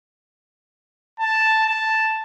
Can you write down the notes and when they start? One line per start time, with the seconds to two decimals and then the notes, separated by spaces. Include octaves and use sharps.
1.20 A5
1.67 A5